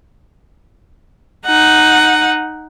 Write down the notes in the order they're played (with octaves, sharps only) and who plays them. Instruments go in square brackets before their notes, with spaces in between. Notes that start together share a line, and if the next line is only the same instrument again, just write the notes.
[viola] D#4 F#5